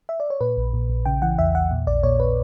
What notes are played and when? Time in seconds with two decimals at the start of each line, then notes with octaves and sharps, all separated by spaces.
0.09 E5
0.20 D5
0.30 C#5
0.40 A#2 B4
0.57 A#1
0.73 A#2
0.90 A#1
1.05 C#3 G5
1.22 E3 F#5
1.38 E2 E5
1.55 E2 F#5
1.71 A#2
1.87 A#1 D5
2.03 A#2 C#5
2.20 B4